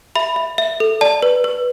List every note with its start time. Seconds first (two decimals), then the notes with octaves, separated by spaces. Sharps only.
0.16 E5 B5
0.36 E5
0.58 E5
0.80 A4
1.01 D5 A5
1.22 B4
1.44 B4